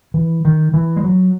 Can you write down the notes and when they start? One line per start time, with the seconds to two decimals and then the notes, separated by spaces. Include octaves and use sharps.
0.14 E3
0.45 D#3
0.74 E3
0.96 G#3
1.04 F#3